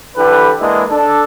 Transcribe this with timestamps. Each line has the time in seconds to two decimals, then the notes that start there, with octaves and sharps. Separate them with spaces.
0.16 D3 E3 G4 A4 B4
0.60 E3 G#3 A#3 B3 D4 E4
0.90 D4 A4